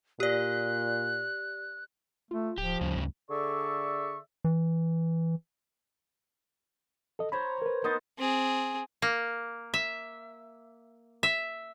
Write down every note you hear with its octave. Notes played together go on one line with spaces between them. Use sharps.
A#2 G4 D5 F#6
A3 F4
D1 F3 G4
D2 G2 C#3
D2
D3 G#4 A4 D5 E5 C#6
E3
A4 D#5
C5 C#5 A#5 B5
A#4 B4
B3 D#4 A#4 C5 A6
C4 G#4
A#3
E5
E5